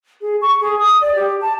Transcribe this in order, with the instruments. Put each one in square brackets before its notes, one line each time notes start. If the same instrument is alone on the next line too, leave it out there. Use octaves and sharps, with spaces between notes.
[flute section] G#4
C#6
G#4
D#6
D5
G4
A5